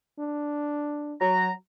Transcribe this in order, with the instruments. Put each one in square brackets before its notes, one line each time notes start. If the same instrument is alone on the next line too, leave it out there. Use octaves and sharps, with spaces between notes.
[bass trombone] D4
[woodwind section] F#3 A#5